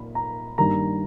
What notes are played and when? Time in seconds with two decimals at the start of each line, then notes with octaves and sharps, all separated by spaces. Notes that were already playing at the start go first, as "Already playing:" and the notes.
Already playing: A#2 B5
0.15 A#5
0.58 G2 D#3 G3 A#3 A#5